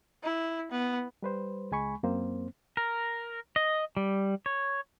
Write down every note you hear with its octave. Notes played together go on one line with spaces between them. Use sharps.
E4
B3
G3 B4 C5
C#2 G#3 G#5 B5 C#6
F#2 A#3 C4 C5
A#4
D#5
G3
C#5